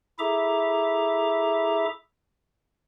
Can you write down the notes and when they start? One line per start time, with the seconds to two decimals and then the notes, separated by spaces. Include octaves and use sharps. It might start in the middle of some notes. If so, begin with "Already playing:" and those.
0.19 E4 G#4 A4 E5 A#5 D6